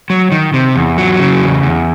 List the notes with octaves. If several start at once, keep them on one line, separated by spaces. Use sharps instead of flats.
F#3
D#3
C3
E2
F#3
C#3
E2
E2